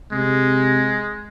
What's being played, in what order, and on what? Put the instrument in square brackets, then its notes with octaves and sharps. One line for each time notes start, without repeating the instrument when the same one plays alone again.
[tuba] C3 [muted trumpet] G#3